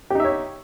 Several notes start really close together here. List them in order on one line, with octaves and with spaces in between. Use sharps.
G4 D#4 E5 C#5